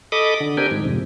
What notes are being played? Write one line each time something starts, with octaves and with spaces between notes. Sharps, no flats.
A4 D#5 B5 D6 D#6
D3
C4 D4 G4 A#4 G5 G#5
G#2 D#3
F2 G#2 C3